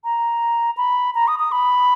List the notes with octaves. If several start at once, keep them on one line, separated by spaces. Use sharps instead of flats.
A#5
B5
A#5
D#6
D#6
B5